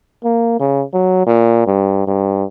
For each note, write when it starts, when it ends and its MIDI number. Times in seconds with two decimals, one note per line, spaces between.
0.24 0.56 58
0.60 0.84 49
0.93 1.25 54
1.27 1.63 46
1.67 2.06 43
2.08 2.44 43